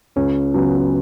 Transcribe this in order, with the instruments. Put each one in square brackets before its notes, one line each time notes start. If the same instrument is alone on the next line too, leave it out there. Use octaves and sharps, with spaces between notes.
[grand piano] C#2 [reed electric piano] C#4
[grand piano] C#3 F#3 B3